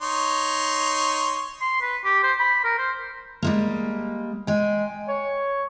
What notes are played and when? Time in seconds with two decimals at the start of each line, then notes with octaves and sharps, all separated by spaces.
0.02 D#4 C#5 C6
1.61 C6
1.81 B4
2.04 G4
2.23 C5
2.39 B5
2.64 A#4
2.78 C5
3.42 G3 G#3 A#3
4.47 G#3 G5 G#5
5.08 C#5